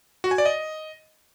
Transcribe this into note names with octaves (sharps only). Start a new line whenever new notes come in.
F#4
G#5
D5
D#5